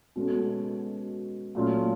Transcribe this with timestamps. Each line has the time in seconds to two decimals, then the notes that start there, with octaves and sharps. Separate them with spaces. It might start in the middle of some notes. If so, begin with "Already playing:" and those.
0.16 B2 G#3 C#4 F#4 A4
1.55 A#2 F#3 A3 C#4 F4